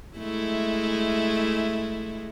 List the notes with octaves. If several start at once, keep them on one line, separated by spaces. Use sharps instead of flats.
G#3 A3 E4